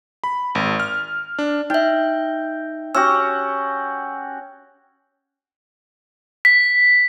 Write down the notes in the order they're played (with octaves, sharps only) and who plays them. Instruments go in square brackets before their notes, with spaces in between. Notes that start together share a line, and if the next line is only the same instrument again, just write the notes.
[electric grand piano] B5
G#1
F6
D4
[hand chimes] D#4 E5 [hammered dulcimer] G5
[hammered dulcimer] C#4 F#4 G4 [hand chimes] E6
[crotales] B6